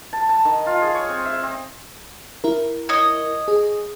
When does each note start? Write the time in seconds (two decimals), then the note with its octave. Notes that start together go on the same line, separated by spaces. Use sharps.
0.13 A5
0.29 A5
0.45 D#3
0.66 F4
0.82 G#4
0.94 C#5
1.09 C4
1.25 E5
1.43 C4
2.44 E4 A#4
2.89 C#5 D#5
3.48 G#4